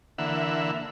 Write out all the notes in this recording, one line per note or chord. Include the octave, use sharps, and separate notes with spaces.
D3 E3 A#3 E5 F#5